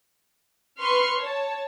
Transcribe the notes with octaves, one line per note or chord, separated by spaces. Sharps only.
B4 C6 C#6 F6
C#5 A5